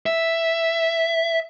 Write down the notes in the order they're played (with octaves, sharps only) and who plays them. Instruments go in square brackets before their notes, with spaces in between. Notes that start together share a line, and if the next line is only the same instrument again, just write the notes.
[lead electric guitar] E5